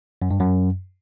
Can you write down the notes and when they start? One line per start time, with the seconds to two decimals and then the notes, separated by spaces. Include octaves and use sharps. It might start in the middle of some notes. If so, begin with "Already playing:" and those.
0.22 F#2
0.31 G2
0.40 F#2